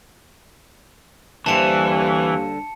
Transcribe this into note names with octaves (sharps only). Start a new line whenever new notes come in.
D#2 D3 E3 G3 C5 A5 C#7